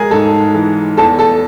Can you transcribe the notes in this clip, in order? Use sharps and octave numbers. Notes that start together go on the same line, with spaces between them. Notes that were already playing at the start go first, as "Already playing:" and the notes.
Already playing: G#3 G#4 A#4 G#5 A#5
G#2 A4 A5
E3
E2 A4 A5
A4 A5